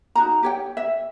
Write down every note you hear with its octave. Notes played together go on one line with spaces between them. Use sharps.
D#4 F#4 A#5
G4 C#5 G5
E5